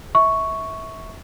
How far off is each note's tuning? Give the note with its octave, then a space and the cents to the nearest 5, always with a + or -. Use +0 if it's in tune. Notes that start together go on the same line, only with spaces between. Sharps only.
E5 -25 C#6 +0